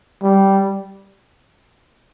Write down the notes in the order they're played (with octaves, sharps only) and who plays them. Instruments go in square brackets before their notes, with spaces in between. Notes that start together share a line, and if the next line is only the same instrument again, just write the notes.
[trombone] G3